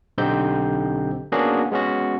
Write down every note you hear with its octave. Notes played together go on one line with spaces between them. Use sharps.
B1 D3 C4 D#4 G4 G6
A#3 B3 C#4 D4 F#4 G#4
G#3 B3 C#4 F#4